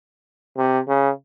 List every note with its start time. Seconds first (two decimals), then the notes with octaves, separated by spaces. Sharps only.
0.57 C3
0.88 C#3